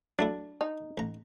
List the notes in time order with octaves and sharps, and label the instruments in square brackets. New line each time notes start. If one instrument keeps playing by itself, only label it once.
[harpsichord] F#3 A3 E4 [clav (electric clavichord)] D4
[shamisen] D#4
[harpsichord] A1 A#5